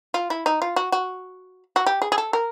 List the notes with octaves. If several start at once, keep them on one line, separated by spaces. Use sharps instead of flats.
F4
E4
D#4
F4
F#4
F#4
F#4
G4
G#4
G#4
A4
A#4